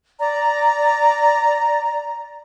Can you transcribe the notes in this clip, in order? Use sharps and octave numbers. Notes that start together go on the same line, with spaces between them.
D5 A#5